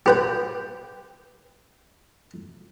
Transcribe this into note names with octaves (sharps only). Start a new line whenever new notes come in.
G4 B4 G5